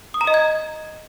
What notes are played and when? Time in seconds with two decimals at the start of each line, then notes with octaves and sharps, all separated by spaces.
0.14 D#6
0.21 A#5
0.27 D#5
0.34 G#6